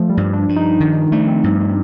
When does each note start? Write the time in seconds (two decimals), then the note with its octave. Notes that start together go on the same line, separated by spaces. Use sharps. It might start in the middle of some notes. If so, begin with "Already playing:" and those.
Already playing: F3 A3
0.10 G3
0.17 G2
0.33 D4
0.49 G2
0.56 D#4
0.80 D#3 D4
1.12 A3
1.27 C4
1.44 G2